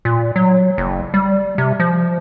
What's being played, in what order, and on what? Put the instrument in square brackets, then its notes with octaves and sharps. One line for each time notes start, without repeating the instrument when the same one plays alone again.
[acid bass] A#2
F#3
F#1
G3
C3
F3